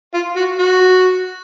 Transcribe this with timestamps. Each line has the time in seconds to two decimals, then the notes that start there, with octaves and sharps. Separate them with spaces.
0.14 F4
0.36 F#4
0.58 F#4